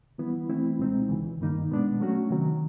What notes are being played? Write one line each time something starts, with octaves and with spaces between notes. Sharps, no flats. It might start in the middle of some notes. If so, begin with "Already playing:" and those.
E3 G3 B3 E4
E3 A3 C4 E4
C#2 B2 G#3 C4 D#4
C#2 C#3 E3
G2 D#3 G3 A#3 D#4
B2 G#3 B3 D4
F#3 A3 C#4 F#4
C3 D#3 F#3